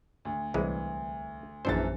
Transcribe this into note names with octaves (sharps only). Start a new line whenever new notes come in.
D2
C2 E3 G#3
A#1 F#2 E3 D4 C5 A6